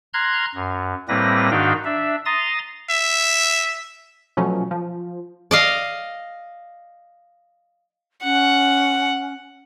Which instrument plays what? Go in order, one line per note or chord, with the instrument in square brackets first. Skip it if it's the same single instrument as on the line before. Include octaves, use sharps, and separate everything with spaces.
[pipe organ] A#5 C6 F6 F#6 G#6
F#2
A2 G3 A#3 C4 B4 A#6
G#2 D#3 D4 F#4 F5 G5
D4 E5
A#5 C6 D#6 A6
[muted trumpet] E5
[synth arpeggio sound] B2 F3 F#3 A3 C#4
F3
[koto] D5 D#5 F5
[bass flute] C#4 [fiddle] F#5